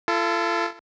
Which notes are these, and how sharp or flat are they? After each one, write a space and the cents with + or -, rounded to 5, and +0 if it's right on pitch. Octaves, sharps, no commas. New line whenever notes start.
F4 -40 A4 +5